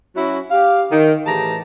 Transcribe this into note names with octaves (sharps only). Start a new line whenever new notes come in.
F#3 C#4 E4 F#4
G4 F5
D#3
A2 E3 G4 G#4 A5 A#5